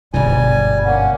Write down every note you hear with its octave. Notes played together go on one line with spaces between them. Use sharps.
G1 G#2 B2 D3 G3 G#5
A#3 C#4 F#5